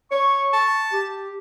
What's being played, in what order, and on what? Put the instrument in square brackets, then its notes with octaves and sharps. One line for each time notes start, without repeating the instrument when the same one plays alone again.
[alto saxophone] C#5 [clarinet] C#6
[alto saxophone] A5
[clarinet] G4